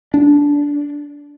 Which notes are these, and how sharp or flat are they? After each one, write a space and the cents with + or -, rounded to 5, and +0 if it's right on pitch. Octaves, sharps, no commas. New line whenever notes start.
D4 -15